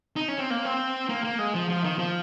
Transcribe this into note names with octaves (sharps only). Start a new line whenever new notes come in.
D#4
C#4
C4
A#3
C4
A#3
A#3
G#3
F3
F3
D#3
F3